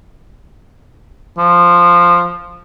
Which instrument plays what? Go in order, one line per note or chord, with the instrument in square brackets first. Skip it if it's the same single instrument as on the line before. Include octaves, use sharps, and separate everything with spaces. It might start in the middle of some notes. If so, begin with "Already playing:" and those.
[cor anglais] F3